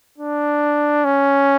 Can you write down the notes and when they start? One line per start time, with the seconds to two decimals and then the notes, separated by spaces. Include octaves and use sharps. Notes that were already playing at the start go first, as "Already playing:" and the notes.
0.18 D4
1.05 C#4